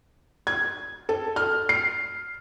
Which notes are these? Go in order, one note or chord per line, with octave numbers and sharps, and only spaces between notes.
G#6
A4
F6
C7